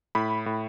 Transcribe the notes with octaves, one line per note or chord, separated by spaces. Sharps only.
A2 B5
A2